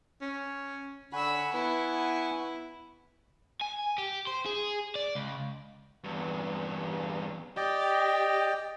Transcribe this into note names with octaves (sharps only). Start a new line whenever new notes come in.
C#4
D3 F#5 G#5 B5 C#6 E6
B3 E4
G#5
G4
C5
G#4
D5
C#2
E2 G2
G4 D5 D#5 G5